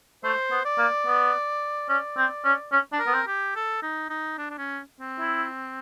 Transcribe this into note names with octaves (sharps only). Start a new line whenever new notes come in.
A3 C5
B3
D5
A#3
B3
C#4 D5
C4
C#4
C#4
D4
A#4
B3
C4
G4
A4
D#4
D#4
D4
D4
C#4
C4
E4